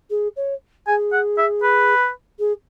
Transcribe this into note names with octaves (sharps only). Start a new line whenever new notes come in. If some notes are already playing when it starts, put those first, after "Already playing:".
G#4
C#5
G#4 G#5
F#5
E5
B4
G#4